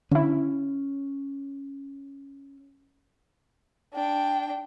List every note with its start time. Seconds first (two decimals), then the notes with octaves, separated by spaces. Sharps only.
0.11 D3 C#4 E4
3.94 D4 G5